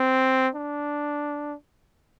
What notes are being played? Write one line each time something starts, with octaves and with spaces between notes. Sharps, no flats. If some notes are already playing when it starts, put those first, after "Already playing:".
Already playing: C4
D4